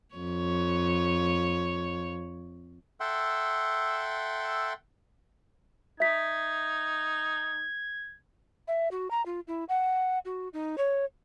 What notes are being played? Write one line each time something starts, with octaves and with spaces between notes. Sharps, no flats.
F2 C#5
A4 E5 F#5 G5 C6
D#4 E5 G#6 B6
E5
F#4
A#5
F4
E4
F#5
F#4
D#4
C#5